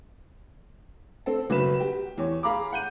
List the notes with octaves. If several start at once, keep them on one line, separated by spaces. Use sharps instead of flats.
C4 A4
F#1 F#3 B4 E7
G4
E2 C#5
G#4 F5 A#5 B5 D6
F#5 G6 D#7